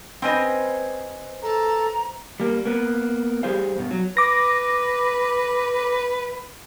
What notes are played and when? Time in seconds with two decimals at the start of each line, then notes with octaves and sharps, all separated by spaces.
0.22 C4 C#4 B4 C5 D#5
1.43 A4 A#5
2.40 G3 A#3
2.65 A#3 B3
3.43 G3 G4 G#4 C5 F5
3.78 G2 B2
3.91 F#3
4.17 B4 D6 A#6